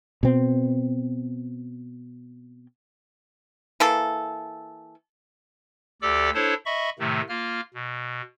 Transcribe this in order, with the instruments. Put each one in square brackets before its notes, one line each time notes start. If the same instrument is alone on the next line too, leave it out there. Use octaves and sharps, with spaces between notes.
[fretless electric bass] B2 C4
[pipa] E3 A#3 A4
[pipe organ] D2 G4 A4 D5 D6 E6
D4 E4 A4 C5 C#5
D#5 E5 B5 C#6
A2 C3 D#3 A3
A#3 F4 F6
B2